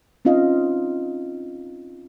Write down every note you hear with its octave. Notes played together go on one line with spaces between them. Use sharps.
C4 C#4 D#4 F4 D#5 F5